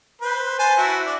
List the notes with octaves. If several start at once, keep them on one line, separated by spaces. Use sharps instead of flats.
B4 C5
C5 G#5 A5
E4 F#4
D4